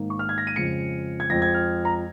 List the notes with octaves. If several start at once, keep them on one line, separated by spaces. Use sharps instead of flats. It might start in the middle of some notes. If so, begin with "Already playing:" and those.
Already playing: G#2 D#3 A#3
C#6
F6
G#6
A#6
D#7
F2 C#3 F3 G#3 C#7
G#6
F2 F3 G#3 A#6
G#6
F6
A#5